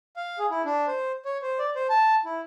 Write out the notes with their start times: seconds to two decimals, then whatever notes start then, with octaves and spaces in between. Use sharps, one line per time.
0.16 F5
0.39 G#4
0.51 E4
0.65 D4
0.87 C5
1.25 C#5
1.42 C5
1.59 D5
1.75 C5
1.90 A5
2.25 E4